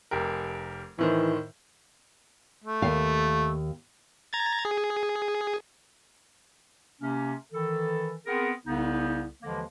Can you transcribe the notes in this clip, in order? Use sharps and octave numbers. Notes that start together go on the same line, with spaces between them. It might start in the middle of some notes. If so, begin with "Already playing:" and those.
F1 G4 A#4
A2 D#3 E3 C5
A3
D#2 F5
A#5 G#6 A6
G#4
C3 A#3 C#4
D#3 E3 A4
B3 C4 G#4 A#4
C2 C#3 B3 D#4
D#2 D3 E3 F3 G#3 A#3